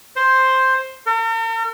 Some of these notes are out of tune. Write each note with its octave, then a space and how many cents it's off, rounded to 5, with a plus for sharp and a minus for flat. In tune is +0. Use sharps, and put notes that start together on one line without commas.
C5 +5
A#4 -45